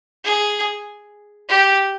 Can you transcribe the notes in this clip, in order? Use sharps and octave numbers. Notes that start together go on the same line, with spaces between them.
G#4
G4